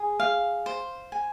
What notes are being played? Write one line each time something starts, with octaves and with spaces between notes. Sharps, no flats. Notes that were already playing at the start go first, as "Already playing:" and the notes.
Already playing: G#4
F5
C5
G#5